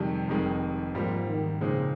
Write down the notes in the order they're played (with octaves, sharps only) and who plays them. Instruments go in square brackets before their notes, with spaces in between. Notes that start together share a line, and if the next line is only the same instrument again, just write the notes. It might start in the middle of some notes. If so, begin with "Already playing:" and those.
Already playing: [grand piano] F2 C3 D#3 G#3 [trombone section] G3
[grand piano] F1 F2 D#3 G#3
[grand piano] G#2 G3 A#3 [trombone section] F3
[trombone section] D#3
[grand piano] A#2 F3 G#3 C4 D#4 [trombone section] C#3